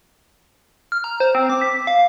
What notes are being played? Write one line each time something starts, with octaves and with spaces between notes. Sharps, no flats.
F6
A#5
C5
C4
D6
B6
F5